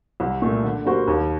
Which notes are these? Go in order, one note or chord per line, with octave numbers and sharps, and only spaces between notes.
C2
A#2 A3
D3
G3 A#3 F#4 C5
D#2